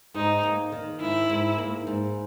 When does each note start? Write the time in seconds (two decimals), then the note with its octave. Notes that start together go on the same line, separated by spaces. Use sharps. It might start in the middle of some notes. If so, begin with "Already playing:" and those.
0.14 G#2 D#4
0.43 A#3
0.72 D#3
1.00 G#2 E4
1.30 G#2
1.58 A#3
1.87 G#2